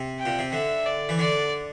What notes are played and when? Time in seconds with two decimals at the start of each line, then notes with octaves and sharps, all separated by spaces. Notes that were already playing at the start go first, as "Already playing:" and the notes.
Already playing: C3
0.19 G5
0.25 A#2
0.39 C3
0.52 D3 E5
0.86 D5
1.09 E3
1.19 D3 D5